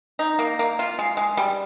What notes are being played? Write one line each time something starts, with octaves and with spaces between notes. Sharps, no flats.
D#4
A#3
A#3
F4
G#3
G#3
G3